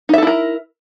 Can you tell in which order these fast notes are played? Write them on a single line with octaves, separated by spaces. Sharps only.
D#4 E5 A4 E4 A#4